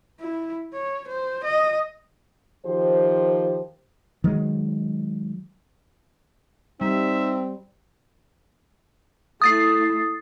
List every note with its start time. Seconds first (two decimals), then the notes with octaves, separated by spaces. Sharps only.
0.20 E4
0.73 C#5
1.08 C5
1.44 D#5
2.66 D#3 F3 G4 C5
4.24 D#3 F#3 G#3
6.81 G3 C4 D#4 E5
9.42 A3 E4 D#6 A6 C7